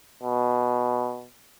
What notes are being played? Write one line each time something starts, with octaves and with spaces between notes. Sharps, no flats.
B2